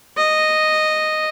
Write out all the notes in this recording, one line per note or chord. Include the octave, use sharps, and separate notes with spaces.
D#5